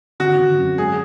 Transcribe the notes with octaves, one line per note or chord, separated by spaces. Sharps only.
D3 F#4
D3
F#2
G#3 G#4